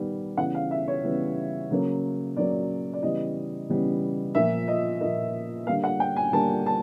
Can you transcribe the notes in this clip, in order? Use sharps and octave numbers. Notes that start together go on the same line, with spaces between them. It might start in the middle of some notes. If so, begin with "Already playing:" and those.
Already playing: D#3 G3 B3
C#3 E3 G3 B3 F#5
F5
E5
C#5
C#3 E3 G3 B3
C#3 F#3 A#3
C#3 F#3 A#3 D5
D5
C#3 E3 G3 B3 D#5
C#3 E3 G3 B3
A#2 F3 A#3 E5
D#5
A#2 F3 A#3 D#5
D3 G3 A#3 F5
F#5
G5
G#5
D3 G3 A#3 A5
A5